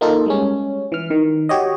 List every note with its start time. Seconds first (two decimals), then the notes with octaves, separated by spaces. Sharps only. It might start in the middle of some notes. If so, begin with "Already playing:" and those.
0.01 A#3 D#4 F4 A4
0.26 G3 G#3 C#4
0.92 E3 F6
1.10 D#3
1.49 F#4 G4 C#5 D#5